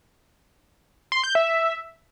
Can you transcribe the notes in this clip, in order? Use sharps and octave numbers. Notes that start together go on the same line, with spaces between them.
C6
G6
E5